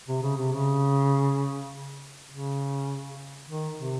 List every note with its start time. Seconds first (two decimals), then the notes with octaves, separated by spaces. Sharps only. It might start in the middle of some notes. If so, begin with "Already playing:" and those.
0.08 C3
0.22 C#3
0.37 C3
0.52 C#3
2.30 C#3
3.49 D#3
3.78 C3